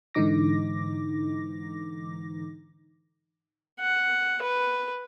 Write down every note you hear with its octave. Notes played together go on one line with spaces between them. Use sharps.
G#2 D3 E3 D#4 D6 A#6
F#5
B4